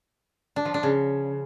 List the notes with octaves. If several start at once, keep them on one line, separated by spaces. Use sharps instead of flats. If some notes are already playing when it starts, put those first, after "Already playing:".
D4
F3
D4
C#3